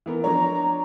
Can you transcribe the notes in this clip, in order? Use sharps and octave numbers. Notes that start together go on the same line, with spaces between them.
E3 B3 A#4
F3 D4 C#5 A#5